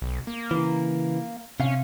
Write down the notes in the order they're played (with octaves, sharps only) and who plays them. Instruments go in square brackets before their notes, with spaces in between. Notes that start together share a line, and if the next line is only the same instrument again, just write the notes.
[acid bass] B1
A#3
[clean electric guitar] C#3 E3
[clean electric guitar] C3 F5 [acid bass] C#4